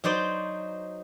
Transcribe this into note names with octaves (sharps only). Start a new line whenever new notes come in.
F#3 D#4 C5 D5 B5